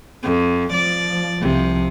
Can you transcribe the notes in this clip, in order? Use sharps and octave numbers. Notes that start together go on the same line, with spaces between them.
F2
F3 D5
C2 C3 F3